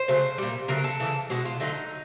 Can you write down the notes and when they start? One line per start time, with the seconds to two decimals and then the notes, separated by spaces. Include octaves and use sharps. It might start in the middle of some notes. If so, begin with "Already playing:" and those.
Already playing: C5
0.08 C#3 F#3 A3
0.38 A#2 G3
0.68 C#3 F#3 A3 A#4
0.84 A4
1.00 C#3 E3 A3
1.30 B2 G#3 F#4
1.45 F4
1.60 D3 F#3 A3 D#4